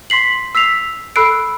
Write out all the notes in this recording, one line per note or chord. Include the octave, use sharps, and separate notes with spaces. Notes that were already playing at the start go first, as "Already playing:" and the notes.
C6 B6 C7 F#7
E6 B6 C7 F7
A4 B5 E6 F#6 C7 D7